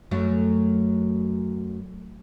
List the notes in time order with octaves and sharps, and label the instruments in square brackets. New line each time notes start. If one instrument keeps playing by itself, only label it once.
[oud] F#2 F#3 A3